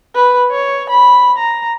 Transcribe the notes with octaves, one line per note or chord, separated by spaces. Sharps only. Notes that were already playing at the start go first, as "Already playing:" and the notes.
B4
C#5
B5
A#5